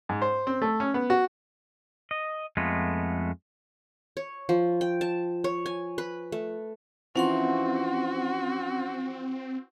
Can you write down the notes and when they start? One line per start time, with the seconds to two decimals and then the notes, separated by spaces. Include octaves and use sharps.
0.09 G#2
0.22 C5
0.47 C4
0.62 A3
0.80 C#4
0.94 B3
1.10 F#4
2.11 D#5
2.57 F2 G#3 A3 B3 F4
4.17 C#5
4.49 F3
4.81 G5
5.01 A5
5.44 C#5
5.66 G#5
5.98 B4
6.32 A3
7.16 E3 F3 C4 C#4 F#4 F#5 C6